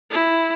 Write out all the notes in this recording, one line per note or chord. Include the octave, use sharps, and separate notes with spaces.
E4